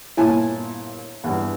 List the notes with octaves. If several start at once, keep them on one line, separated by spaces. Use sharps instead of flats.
G1 A#2 E4 G#5 A5
E2 G2